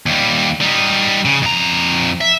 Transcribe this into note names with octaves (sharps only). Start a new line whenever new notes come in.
D#2 G3
G3 D#4
C#3
F2 A#5
E5